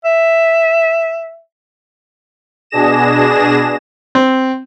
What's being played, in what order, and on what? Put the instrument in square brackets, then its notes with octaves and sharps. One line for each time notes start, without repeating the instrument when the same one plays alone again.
[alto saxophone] E5
[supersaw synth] B2 D4 G#4 A#6 E7
[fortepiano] C4